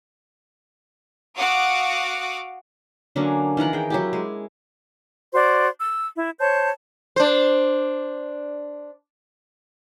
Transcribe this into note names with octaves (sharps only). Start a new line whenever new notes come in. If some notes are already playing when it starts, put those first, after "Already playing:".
F#4 F5 F#5 D6 D#6
D3 F#3 A#3 C#4
D#3 E3 A#4 F#5
G#4 G5
F#3 E4 G4
G#3
F#4 C5 D5
E6
E4
C5 C#5 A5 G6
D4 C5